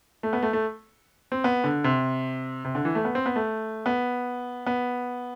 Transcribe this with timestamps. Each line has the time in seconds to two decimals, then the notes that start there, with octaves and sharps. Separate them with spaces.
0.23 A3
0.33 B3
0.43 A3
0.53 A3
1.32 C4
1.44 B3
1.64 D3
1.84 C3
2.65 C3
2.75 D3
2.85 E3
2.95 A3
3.05 B3
3.15 C4
3.26 B3
3.36 A3
3.86 B3
4.67 B3